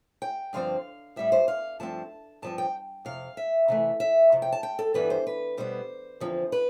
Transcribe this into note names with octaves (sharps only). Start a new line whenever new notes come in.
G5
G2 D3 F3 C4 F5
A2 G3 B3 E5
C5
F5
G2 F3 A3 C4 A5
G2 F3 C4 A5
G5
F2 C3 F5
E5
C3 E3 A3
E5
F2 C3
G5
A5
G5
A4
G2 E3 G3 B3 B4
C5
B4
B2 G3 B3 C5
E2 D3 F3 C4
B4